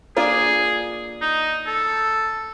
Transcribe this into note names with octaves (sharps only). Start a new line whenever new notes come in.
A#3 D4 F4 G#4
D#4
A4